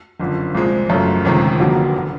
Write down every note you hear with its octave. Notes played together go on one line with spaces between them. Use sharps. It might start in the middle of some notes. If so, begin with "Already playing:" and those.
F#1 F2 D3 F3
C2 A#2 F3 G#3 C4
F#1 F#2 C#3 F3 A3
G1 F2 C3 D#3 G#3
F1 F2 D3 F#3 A#3
D3